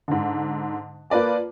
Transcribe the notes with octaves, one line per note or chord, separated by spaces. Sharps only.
G#2 D3
A#3 F4 B4 D5 A5